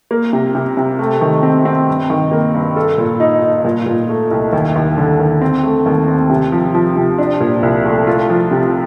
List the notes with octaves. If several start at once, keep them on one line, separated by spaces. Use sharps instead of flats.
A#3
C3
C3
C3
A3
D#3
C4
C4
G2
D#3
A#3
G2
A4
A#2
D#4
D#4
A#2
A#2
A3
C2
D#2
D#2
D3
D#2
C4
A3
D#2
C4
C3
F3
F3
C3
D4
A#2
C2
A3
F4
F3
C3